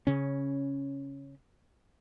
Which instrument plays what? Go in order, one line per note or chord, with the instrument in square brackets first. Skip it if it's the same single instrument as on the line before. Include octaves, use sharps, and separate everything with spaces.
[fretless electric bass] C#3 C#4